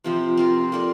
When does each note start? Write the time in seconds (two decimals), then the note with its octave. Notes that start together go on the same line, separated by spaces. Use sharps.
0.04 C3 F3 C4
0.37 C4 F4 A#4
0.72 A#3 F4 A4 D5